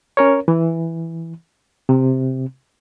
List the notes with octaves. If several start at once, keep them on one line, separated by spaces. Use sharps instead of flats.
C#4 A#4 C#5
E3
C3